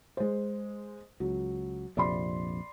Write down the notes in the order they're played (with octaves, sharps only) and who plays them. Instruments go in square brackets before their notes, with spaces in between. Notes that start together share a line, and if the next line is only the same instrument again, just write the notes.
[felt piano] G#3 C5
[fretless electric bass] C#2 [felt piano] F#3
[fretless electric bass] A#1 F2 C3 [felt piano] D5 B5 C6